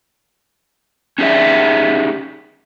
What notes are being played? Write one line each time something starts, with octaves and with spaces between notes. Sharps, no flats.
C#4 D#4 G4 G#4 D5 E5